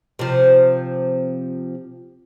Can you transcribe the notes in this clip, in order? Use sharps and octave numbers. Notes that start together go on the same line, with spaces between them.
C3 F3